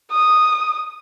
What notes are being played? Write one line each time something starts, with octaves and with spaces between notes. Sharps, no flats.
D#6